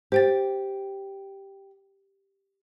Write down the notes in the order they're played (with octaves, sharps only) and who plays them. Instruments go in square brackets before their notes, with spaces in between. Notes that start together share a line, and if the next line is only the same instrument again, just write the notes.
[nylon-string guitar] G4 [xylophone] C5 G5 A6